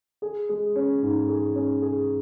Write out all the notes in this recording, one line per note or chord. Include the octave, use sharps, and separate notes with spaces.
G#4
G#3
C#4
G#2
G#4
C#4
G#4